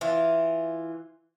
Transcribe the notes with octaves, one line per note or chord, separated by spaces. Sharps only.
E3 F4